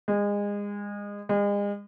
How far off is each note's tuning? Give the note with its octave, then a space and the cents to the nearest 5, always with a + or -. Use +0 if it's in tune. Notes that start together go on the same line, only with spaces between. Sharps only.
G#3 -30
G#3 -40